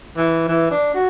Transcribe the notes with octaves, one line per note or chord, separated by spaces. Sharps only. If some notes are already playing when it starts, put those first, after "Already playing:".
E3
E3
D4
F#4